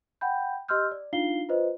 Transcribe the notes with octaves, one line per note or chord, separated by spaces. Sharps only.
F#5 G5 B5 G6
G4 D#5 C6 E6 F6 G6
D5
D4 D#4 F4 F5 C7 G7
F4 B4 C5 D#5